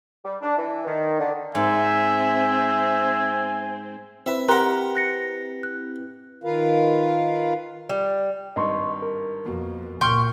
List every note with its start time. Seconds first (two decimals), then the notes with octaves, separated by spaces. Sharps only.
0.24 G3
0.41 D4
0.57 E3
0.85 D#3
1.19 D3
1.55 G#2 C4 E5 G#5
4.26 C4 E4 B4 E5
4.49 G4 A#4 F#5 A#5 C6 F#6
4.95 F#6 A#6 C#7
5.63 F#6
6.44 D#3 F4 A#4 B4 F5
7.89 G3
8.56 G#1 G2 D#5 C6 C#6
9.02 A#4
9.46 F2 B2 A#3
10.01 C#2 A#2 G5 C6 C#6 F6